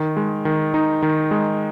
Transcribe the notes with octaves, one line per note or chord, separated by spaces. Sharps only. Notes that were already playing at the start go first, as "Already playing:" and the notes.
Already playing: D#3
G#3
D#3
D#4
D#3
G#3